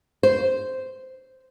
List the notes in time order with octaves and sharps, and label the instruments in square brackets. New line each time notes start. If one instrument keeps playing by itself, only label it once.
[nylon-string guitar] C5